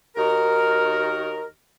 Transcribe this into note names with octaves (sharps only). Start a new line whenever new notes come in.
D#2 D#3 F#4 A#4